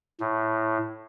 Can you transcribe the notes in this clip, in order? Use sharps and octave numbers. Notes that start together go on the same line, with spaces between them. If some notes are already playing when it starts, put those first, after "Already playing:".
A2